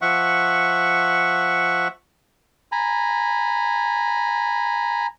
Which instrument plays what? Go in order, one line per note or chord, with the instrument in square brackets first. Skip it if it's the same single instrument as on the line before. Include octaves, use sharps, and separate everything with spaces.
[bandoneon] F3 E5 F#5 C#6
[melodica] G#5 A#5 B5